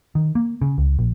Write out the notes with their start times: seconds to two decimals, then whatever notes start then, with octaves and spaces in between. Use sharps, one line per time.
0.15 D#3
0.35 A#3
0.62 C#3
0.78 C#2
0.99 A#1